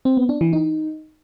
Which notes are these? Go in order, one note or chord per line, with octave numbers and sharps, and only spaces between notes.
C4
B3
D4
E3
D#4